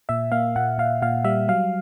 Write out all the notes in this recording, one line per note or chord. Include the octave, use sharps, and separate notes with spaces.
A#2 E5
A#3 F5
A#2 F#5
A#2 F5
A#2 F5
G3 E5
F#3 F5